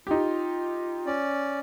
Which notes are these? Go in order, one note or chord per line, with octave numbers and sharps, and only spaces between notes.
D#4 F4 G4
C#4 D5